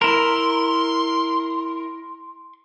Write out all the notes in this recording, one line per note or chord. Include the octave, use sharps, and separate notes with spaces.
E4 A#4 C6